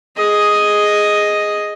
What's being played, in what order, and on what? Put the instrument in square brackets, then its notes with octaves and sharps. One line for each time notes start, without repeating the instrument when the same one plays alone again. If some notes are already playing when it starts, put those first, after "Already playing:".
[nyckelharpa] G#4 D#5